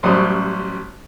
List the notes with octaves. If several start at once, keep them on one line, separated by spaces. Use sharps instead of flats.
A1 F#2 F#3 G3 C5 D#6